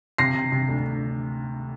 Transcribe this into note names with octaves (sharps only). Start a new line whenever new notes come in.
C3 A#6 C7
C3
C3
D2